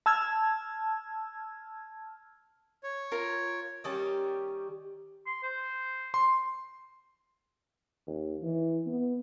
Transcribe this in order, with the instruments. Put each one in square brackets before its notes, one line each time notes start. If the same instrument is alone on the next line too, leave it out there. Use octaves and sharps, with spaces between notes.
[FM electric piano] A5 E6 F6 G#6
[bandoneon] C#5
[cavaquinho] F4 A#4
[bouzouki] D#3 G3 C#4 G4
[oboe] C6
C5
[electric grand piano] C6
[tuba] D#2
E3
B3